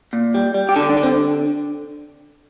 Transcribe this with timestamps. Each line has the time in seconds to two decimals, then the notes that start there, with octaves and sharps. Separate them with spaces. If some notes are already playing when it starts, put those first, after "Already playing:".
0.13 A#2
0.34 G3
0.54 G3
0.69 G4
0.76 D3 A4
0.89 D4
0.97 D3
1.03 C4